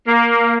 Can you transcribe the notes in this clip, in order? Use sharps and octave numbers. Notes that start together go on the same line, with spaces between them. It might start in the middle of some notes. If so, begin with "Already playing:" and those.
A#3